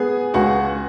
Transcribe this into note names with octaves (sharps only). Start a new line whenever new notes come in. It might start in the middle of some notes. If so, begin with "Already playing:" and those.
Already playing: B3 G#4 G#5
C#2 F#4 F#5